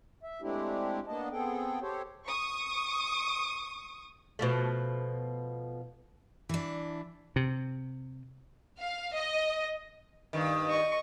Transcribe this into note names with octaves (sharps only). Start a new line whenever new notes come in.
E5
G#3 A3 C4 D4 E4 G4
A#3 B3 D4 D#5 A5
B3 C4 G#4 A4 G5
G4 A4 C5 C#5
C#6 D#6
B2 F3 A3
E3 D4
C3
F5
D#5
G2 D#3
D#5 C#6